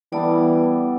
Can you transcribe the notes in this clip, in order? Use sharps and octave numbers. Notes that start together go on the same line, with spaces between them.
E3 G3 B3 A4 D5